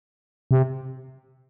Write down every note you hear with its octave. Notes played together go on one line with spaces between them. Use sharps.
C3